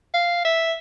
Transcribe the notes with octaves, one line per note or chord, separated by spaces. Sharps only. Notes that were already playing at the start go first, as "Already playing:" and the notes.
F5
E5